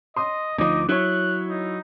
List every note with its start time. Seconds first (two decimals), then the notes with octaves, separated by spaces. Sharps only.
0.16 D#5 C6 D#6
0.58 D2 F3 D#4 D#5 D6
0.89 F#3 E4 C#5 F#6
1.49 D#4